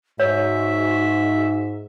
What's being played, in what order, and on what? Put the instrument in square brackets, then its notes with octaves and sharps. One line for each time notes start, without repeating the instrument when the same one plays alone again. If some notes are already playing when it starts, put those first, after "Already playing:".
[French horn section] G#2 [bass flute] F#4 [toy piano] C#5 [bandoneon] E5